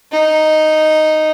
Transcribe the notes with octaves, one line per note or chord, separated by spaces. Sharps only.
D#4